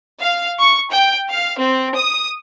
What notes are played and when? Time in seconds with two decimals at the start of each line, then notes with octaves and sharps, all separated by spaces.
0.20 F5
0.59 C#6
0.91 G5
1.29 F5
1.58 C4
1.95 D#6